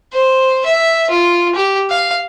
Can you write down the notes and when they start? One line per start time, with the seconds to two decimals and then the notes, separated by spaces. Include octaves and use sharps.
0.13 C5
0.65 E5
1.10 F4
1.55 G4
1.90 F5